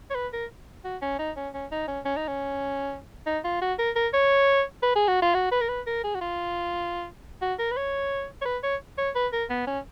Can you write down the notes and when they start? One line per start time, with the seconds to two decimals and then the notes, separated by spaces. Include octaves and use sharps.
0.10 C#5
0.15 B4
0.33 A#4
0.84 F#4
1.02 C#4
1.19 D#4
1.37 C#4
1.54 C#4
1.71 D#4
1.88 C#4
2.05 C#4
2.17 D#4
2.28 C#4
3.27 D#4
3.44 F4
3.61 F#4
3.79 A#4
3.96 A#4
4.14 C#5
4.83 B4
4.96 G#4
5.08 F#4
5.22 F4
5.34 F#4
5.52 B4
5.61 A#4
5.69 B4
5.87 A#4
6.04 G#4
6.15 F#4
6.21 F4
7.42 F#4
7.59 A#4
7.72 B4
7.77 C#5
8.41 C#5
8.45 B4
8.63 C#5
8.98 C#5
9.15 B4
9.33 A#4
9.50 B3
9.67 C#4